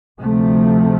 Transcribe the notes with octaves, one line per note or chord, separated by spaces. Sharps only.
D2 C3 F3 A3